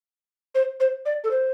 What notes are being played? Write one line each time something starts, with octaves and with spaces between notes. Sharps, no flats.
C5
C5
D5
A4
C5